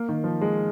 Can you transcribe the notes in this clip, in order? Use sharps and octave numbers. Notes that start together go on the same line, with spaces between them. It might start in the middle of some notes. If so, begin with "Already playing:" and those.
Already playing: A#3
D#3
F3
G#3